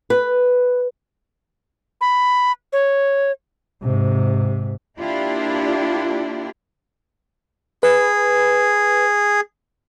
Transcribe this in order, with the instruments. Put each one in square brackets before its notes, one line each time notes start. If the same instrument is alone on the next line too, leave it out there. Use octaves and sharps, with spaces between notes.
[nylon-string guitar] B4
[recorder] B5
C#5
[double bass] G#2 C3
[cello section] A#3 D4 E4 F4 G4
[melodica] G#4 [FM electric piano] B4